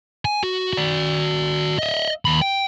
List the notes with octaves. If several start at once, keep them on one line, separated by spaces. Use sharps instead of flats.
G#5
F#4
F#4 D5
D#5 E5
D#2 B5
G5